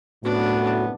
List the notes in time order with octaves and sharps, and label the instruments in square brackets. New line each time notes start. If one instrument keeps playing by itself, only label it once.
[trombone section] C2 F#2 B3 [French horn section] A2 [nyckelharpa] D4 [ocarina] F#4